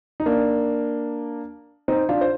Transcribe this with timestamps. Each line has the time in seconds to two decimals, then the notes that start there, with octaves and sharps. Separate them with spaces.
0.20 D#4
0.26 A#3 D4
1.88 C4 D#4
2.09 D4 F4
2.21 C5